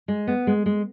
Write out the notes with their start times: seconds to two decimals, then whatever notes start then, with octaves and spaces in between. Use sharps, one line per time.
0.08 G#3
0.27 B3
0.47 G#3
0.66 G#3